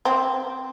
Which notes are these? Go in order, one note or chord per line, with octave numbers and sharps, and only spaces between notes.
C4